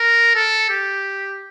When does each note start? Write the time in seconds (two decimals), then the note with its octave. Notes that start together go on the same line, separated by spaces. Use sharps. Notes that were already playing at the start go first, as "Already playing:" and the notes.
Already playing: A#4
0.35 A4
0.70 G4